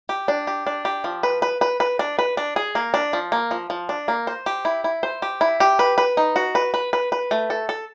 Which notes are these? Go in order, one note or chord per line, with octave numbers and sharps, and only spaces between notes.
G4
D4
G4
D4
G4
F3
B4
B4
B4
B4
D4
B4
D4
G#4
A#3
D4
F3
A#3
F3
F3
D4
A#3
C5
G4
E4
E4
C5
G4
E4
G4
B4
B4
D#4
F#4
B4
B4
B4
B4
A3
A4
A4